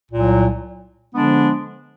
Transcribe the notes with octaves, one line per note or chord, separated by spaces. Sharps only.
C2 A#2 F#3
D3 F3 G#3 B3 D4